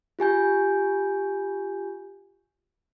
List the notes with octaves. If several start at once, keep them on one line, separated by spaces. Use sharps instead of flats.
F4 G4 G#5 G6